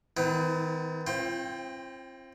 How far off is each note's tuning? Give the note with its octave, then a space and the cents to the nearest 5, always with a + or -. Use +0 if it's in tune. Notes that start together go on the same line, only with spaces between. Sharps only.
D#3 +40 B3 +45 E4 -15
C4 +30 F4 -35 G5 +0